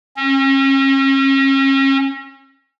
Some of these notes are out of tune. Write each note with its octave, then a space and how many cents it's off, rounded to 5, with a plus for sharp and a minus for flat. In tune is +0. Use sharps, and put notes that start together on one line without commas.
C#4 -35